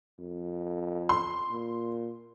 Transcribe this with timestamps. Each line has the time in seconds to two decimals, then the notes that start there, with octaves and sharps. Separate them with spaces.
0.19 F2
1.09 C6
1.51 A#2